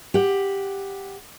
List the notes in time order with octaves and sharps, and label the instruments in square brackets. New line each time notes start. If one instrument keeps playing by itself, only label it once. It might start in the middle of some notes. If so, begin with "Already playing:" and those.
[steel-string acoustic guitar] G4 F#5